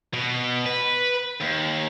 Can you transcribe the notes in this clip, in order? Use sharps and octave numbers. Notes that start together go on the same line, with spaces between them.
B2
B4
D#2